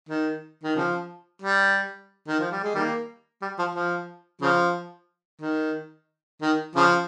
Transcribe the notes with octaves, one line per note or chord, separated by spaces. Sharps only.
D#3
D#3
C#3 F3
G3
D#3
F3
G3
G#3
D#3 G3 A#3
G3
F3
F3
C#3 F3
D#3
D#3
C#3 F3